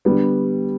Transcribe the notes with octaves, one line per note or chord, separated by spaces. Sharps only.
D3 G3 B3